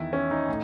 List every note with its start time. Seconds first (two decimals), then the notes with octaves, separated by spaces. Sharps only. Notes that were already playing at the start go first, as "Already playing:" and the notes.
Already playing: E2 D#3 E4
0.13 C#4
0.31 D#4
0.48 A2